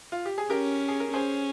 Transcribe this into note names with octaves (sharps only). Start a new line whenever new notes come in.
F4
G4
G#4
C#4 G4 A#4
G#4
A#4
C#4 G#4 C5